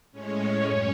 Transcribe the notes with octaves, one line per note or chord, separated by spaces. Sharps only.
A2 G#3 C#4 C#5
F#2